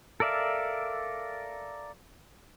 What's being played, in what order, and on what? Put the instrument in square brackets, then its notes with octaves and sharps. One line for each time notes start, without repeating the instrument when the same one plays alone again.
[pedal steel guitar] A4 A#4 D5 E5 F5